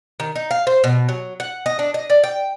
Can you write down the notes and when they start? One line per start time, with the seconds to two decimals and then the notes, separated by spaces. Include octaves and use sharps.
0.20 D#3
0.36 D#4
0.51 F5
0.67 C5
0.84 B2
1.09 F#3
1.40 F#5
1.66 D#5
1.79 D4
1.94 D#5
2.10 D5
2.24 G5